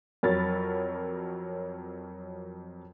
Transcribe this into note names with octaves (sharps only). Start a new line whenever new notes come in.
F2 F#3 A#4 C#5 B5 A6